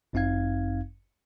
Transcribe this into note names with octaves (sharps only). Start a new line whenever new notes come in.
G1 F#2 C4 D#4 F5 G#6